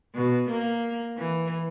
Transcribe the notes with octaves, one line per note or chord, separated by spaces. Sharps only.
B2
A#3
E3